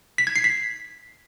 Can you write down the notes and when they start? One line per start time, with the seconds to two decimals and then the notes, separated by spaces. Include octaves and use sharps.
0.18 B6
0.27 G#6
0.36 C7
0.44 B6